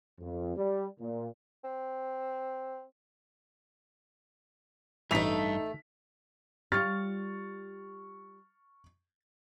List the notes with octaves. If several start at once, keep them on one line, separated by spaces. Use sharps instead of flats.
F2
G3
A#2
C4
A1 G2 E3 A3 D#4 A4 B6 F7
G3 F4 C#6 F6 A6